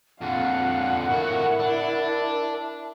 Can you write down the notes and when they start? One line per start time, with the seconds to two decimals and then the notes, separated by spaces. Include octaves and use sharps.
0.21 F2 D3 F5 F#5
1.09 A2 E4 F#4 A#4
1.59 D4